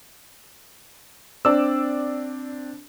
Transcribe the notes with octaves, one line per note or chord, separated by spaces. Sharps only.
C4 D4 D5 D6 E6